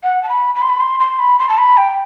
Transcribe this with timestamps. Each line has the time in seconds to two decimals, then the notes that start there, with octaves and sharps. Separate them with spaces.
0.03 F#5
0.23 A5
0.29 B5
0.55 B5
0.62 C6
0.70 B5
0.80 C6
1.00 C6
1.19 B5
1.39 C6
1.49 A5
1.58 B5
1.77 G5